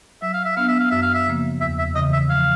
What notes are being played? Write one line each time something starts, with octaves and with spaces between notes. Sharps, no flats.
F#3 E5
F5
E5
B3 D4 F5
E5
F5
F#2 E5
F5
E5
C#3 F3 A#3
E2 E5
E5
C#3 E3 D#5
E5
F3 F5